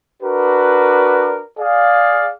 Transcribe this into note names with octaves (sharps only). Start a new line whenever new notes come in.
D4 F#4 A#4 B4
G#4 D5 F5